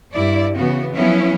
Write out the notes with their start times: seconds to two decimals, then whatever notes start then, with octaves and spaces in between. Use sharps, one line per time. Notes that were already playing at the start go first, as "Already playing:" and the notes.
0.12 G2 E4 D5
0.56 C#3 E3 B3 F#4
0.93 F3 F#3 B3 C#4 E4